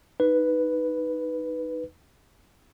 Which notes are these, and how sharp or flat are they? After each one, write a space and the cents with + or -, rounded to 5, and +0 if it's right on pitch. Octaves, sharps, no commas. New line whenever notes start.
D#4 +0 B4 +0